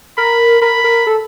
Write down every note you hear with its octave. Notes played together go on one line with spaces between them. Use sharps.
A#4 B5
A#4 B5
A#4
A4